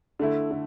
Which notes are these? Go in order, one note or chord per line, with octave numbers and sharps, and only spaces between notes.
D3 A3 E4
D3